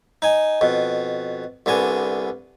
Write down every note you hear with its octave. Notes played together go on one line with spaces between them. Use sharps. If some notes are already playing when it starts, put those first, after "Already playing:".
D#4 G#5
F2 B2
C2 D3 B3 G#5